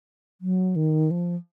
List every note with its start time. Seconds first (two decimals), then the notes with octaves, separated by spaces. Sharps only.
0.41 F#3
0.76 D#3
1.11 F3